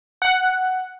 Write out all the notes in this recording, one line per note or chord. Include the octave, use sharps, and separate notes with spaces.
F#5